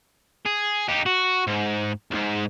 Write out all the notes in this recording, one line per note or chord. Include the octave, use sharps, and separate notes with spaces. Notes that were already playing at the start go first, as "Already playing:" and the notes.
G#4
D#4 G4
F#4
G#2
C#2 G#2